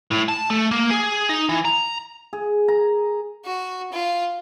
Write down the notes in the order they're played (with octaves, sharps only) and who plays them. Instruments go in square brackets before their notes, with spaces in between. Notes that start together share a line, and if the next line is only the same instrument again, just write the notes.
[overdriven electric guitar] A2
A5
A3
A#3
G#4
D#4
E3
A#5
[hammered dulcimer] G#4
A#5
[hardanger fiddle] F#4
F4